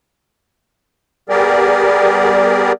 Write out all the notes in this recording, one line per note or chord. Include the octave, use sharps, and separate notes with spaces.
G3 B3 G4 G#4 A#4 D5